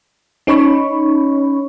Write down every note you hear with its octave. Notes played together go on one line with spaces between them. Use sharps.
C#4 D#4 C#5 B5 C#6